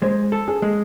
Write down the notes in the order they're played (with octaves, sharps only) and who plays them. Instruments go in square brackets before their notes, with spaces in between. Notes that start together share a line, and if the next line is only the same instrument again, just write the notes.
[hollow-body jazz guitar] G#3 [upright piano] C5
[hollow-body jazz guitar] A4
[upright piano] G#4
[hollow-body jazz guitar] G#3